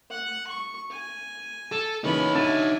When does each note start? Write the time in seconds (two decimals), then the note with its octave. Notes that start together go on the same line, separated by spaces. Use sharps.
0.10 F#5
0.47 C#6
0.91 G#5
1.72 A4
2.04 A#2 C#3 E3 C#4 D#4 C#5 B5
2.35 D3 E5 G#5 A6 E7